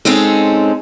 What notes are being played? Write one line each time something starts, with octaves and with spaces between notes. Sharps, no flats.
G#3 C4 C#4 D#4 A4